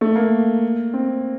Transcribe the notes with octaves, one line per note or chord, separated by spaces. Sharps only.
A3
A#3
C4